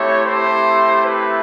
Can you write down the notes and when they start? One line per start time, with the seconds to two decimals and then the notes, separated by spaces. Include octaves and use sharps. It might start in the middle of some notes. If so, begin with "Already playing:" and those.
Already playing: A3 C4 E4 G4 C#5
0.26 C5
1.05 B4